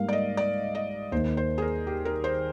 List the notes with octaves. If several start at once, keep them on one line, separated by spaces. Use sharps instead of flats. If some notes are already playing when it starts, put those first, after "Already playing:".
Already playing: G#2 G3 A#3 F5
D5
D#5
D5
D#5
D#2 D#3 A#3 C5
C5
G#4
A#4
G4
A#4
C5